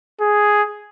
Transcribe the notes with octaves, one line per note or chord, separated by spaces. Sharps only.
G#4